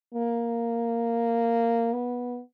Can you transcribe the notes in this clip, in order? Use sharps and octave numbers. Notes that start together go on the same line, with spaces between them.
A#3
B3